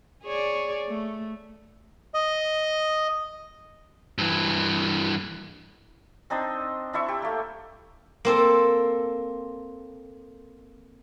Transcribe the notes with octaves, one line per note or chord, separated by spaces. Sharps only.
G#4 C#5 D5
A3
D#5
G2 E3
C4 D4 D#4 C5
D4 E4 E5 C#6
G4
A3 A#3
A#3 C4 A4